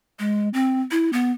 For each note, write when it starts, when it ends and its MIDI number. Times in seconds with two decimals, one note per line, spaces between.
0.19 0.49 56
0.54 0.81 60
0.91 1.10 64
1.13 1.31 59